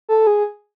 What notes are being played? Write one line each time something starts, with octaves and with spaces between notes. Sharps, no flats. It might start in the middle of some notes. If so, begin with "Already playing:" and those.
A4
G#4